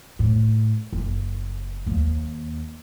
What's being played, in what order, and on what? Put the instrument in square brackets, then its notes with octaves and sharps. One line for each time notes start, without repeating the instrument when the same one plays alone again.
[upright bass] A2
F#1
D#2 A#3